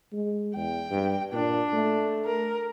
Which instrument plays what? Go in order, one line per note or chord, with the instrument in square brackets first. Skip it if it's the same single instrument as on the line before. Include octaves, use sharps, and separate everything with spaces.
[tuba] G#3
[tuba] E2 [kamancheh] G5
[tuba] G2
[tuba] A#2 [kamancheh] D4
[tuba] A3
[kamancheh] A#4